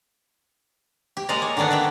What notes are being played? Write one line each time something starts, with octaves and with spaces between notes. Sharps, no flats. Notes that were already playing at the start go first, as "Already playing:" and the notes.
G4
G#3 A#3 D5 D#5 F5 A#5
C#5
D3 D#3 A#3 B3 D4
D5 E5 G5